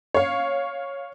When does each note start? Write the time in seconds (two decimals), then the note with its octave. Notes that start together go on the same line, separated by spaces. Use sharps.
0.14 C#5 F5